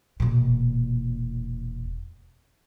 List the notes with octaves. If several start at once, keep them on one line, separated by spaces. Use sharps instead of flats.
E1 A#2